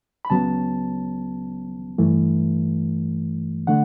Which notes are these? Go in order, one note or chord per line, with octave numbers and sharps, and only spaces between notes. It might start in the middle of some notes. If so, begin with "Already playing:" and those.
B5
C#2 C#3 F#3 B3 A5
G2 E3 A3
D3 A3 F#5